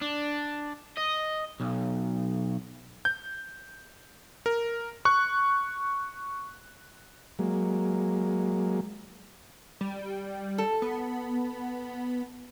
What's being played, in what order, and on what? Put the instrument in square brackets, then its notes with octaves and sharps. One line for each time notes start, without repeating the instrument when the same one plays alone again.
[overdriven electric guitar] D4
D#5
B1
[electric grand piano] G6
A#4
C#6 F#6
[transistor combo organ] F#3 G#3 A#3
[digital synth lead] G3
[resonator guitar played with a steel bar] A4
[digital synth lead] B3